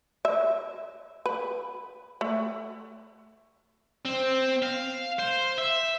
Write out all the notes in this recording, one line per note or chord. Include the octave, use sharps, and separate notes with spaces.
E5
B4
A3
C4
F5
C5
E5